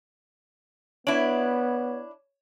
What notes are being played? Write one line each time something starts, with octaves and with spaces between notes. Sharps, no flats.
B3 D4 E4 C#5